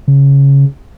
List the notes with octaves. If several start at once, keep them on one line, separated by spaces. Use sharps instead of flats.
C#3